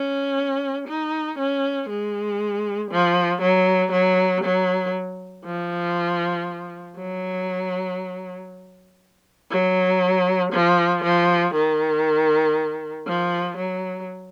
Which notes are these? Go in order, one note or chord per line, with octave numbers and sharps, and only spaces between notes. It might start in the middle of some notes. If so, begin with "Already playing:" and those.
Already playing: C#4
D#4
C#4
G#3
F3
F#3
F#3
F#3
F3
F#3
F#3
F3
F3
D#3
F3
F#3